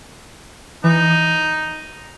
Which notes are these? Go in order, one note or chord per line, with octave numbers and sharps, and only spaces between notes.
E3 D#4